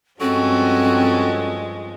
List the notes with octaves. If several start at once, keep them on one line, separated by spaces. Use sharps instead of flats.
G2 F3 G#3 C4 C#4 F#4 A4